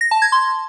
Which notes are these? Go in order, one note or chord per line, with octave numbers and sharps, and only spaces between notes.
A#6
A5
G#6
C6